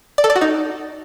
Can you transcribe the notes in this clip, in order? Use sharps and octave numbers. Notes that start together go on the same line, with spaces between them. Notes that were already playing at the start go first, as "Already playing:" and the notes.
D5
A4
D5
F#4
D#4